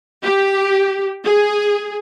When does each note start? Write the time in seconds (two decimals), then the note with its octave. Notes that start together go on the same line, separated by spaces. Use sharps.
0.22 G4
1.25 G#4